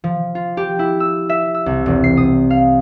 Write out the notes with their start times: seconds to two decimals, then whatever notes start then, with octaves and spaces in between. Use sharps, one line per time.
0.04 F3
0.35 F4
0.57 G4
0.79 E4
1.00 E6
1.29 E5
1.54 E6
1.66 C2
1.86 E1
2.04 C7
2.17 D#6
2.50 F5